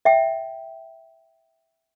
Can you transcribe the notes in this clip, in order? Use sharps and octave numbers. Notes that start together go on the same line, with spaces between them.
E5 G5